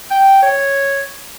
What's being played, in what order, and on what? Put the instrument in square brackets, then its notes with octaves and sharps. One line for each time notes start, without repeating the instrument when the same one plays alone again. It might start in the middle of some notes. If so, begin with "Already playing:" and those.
[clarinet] G5
C#5